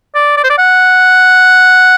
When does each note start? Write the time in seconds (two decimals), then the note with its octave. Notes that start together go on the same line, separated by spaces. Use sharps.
0.15 D5
0.37 D5
0.44 C5
0.50 D5
0.58 F#5